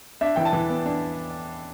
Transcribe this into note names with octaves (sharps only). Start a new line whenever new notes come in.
D4 E5
E3 G5
A5
E3
B3
D4